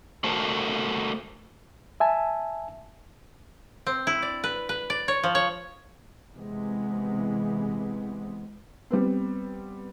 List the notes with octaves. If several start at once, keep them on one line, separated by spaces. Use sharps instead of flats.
A3 F#4 A4 A#4 C5
E5 G#5 A5
C4
E4
D5
B4
B4
D5
C#5
F3
C#5
C3 E3 G#3 B3
G3 B3 C4